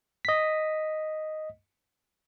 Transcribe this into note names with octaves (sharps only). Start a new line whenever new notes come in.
D#5 B6